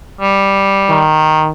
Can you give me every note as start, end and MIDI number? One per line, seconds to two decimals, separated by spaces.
0.21 1.00 55
0.89 1.51 51